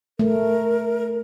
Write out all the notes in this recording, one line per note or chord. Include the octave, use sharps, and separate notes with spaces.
A3 A#4